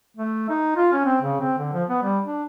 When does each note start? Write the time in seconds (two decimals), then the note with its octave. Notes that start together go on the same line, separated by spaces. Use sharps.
0.17 A3
0.49 D#4
0.76 F4
0.93 C#4
1.05 C4
1.22 C#3
1.41 C4
1.58 D3
1.74 F3
1.89 B3
2.02 G3
2.25 D4